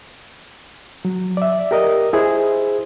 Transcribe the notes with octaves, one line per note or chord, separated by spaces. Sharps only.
F#3
D5 E5
G4 A#4 D#5
E4 G#4 C5